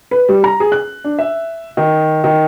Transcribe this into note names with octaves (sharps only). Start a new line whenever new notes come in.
B4
G3
A#5
G#4
F#6
D4
E5
D#3
D#3